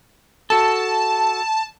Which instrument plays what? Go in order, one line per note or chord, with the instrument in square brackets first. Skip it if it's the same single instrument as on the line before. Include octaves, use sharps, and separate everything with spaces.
[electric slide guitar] F#4 A4 [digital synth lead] A5